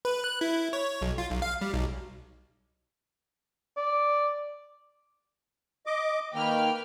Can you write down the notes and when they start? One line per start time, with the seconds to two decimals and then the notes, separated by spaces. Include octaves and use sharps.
0.05 B4
0.24 F#6
0.41 E4
0.73 C#5
1.01 B1
1.18 F4
1.30 B1
1.42 F5
1.61 G3
1.74 B1
3.77 D5
5.86 D#5 D6
6.34 D#3 A#3 B4 G5 F6